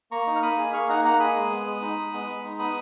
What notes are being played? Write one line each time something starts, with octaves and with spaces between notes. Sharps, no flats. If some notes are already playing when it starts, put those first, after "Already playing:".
A#3 A#5 C#6
D#4
F6
A#3 B5 D#6
G#4
A#3 C#6 F6
D#4 F#5 A#5
A#3 F#5 A#5
G#4 B5 D#6
G#3
B3
G#3
D#4
G#3
B3
G#3
D#4
B3 B5 D#6